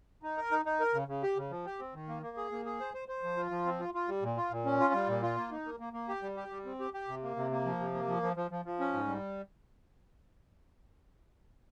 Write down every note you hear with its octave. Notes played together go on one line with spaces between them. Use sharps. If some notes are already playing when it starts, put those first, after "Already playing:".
D#4
A#4
D#4
D#4
A#4
C#3
C#3
G4
C#3
F3
G4
C4
D#3
A#3
A#3
G#4
A#3
G#4
C5
C5
C5
F3
F4
F3
C4
F4
F4
G3
A#2
F4
A#2
C#4
F4
G3
A#2
F4
A#3
D#4
A#3
A#3
A#3
G4
G3
G4
G3
C4
G4
G4
C3
A#3
C3
A#3
F3
C3
A#3
F3
F3
F3
F3
F3
C#4
G#2
G3